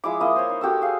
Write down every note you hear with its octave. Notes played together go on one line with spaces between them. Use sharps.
F3 G#3 E4 D6
A#3 E4 D#5
C5 C#5
D#4
F#4 G4 A4 E6
G#4 F5